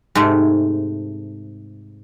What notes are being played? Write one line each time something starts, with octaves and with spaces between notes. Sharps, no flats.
G#2 C3 G#3 A3